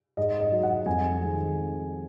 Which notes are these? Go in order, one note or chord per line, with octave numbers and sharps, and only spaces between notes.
G#2 D#5
D#5
F#3
F#5
F2 G#5
D#3 G#3